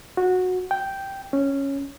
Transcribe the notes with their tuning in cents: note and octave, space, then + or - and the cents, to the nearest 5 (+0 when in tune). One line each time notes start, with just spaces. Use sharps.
F#4 -15
G5 -5
C#4 -5